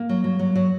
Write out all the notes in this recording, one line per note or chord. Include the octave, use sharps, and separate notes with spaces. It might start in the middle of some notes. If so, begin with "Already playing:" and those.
Already playing: A#3
F#3
F#3
F#3
F#3